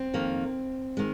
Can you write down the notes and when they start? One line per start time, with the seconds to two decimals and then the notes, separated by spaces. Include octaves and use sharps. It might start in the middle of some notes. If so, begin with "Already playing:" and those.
Already playing: C4
0.14 F2 D#3 A#3
0.97 D#3 G#3